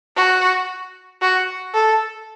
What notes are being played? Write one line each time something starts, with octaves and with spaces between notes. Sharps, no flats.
F#4
F#4
A4